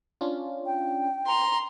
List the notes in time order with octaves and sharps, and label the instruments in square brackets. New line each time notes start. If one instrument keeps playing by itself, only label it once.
[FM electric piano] C#4 D4 F4
[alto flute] G5
[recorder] A#5 [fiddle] C6